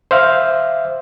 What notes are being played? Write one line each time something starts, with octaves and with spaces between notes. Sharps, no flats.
C5 E5 F5